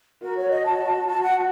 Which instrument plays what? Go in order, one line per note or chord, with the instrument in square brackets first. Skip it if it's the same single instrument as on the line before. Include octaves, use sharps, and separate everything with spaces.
[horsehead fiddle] F#4 [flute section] A#4
[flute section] C#5
D#5
A5
[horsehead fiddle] F#4 [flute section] A5
[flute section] F#5